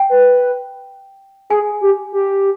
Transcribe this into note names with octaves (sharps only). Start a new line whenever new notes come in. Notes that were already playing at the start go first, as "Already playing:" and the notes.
Already playing: G5
B4
G#4 G#5
G4
G4